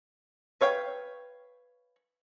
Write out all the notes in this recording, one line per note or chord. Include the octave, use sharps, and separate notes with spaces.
B4 C#5 F5 G5